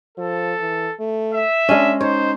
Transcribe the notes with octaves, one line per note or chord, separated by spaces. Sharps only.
F3 A4
E3
A3
E5
G#3 C#4 D4
D#4 C5 C#5